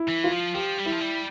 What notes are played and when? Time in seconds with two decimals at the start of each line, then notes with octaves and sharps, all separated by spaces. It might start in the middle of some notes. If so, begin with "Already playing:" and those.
Already playing: E4
0.09 E3
0.24 F4
0.32 F3
0.54 F3 G4
0.78 G3
0.86 E4
0.92 F3
1.01 G3